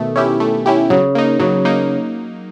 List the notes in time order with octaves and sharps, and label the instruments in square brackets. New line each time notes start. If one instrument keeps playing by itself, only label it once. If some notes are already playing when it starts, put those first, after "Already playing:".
Already playing: [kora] B2 D#3 [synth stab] A3
[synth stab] C#4 E4 G4
A3
C#4 E4 G4
[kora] C#3 [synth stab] F#3
[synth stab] A#3 D#4
[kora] C#3 [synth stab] F#3
[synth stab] A#3 D#4